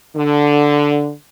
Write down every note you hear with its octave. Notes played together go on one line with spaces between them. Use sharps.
D3